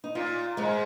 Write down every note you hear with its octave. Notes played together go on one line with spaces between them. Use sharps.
D#4
A#2 F4
G#2 G#3